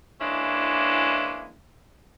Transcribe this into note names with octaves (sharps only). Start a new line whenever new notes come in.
E3 G#3 A#3 C#4 D4 E4